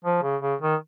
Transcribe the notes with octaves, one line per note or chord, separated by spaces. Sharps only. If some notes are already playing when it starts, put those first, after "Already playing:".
F3
C#3
C#3
D#3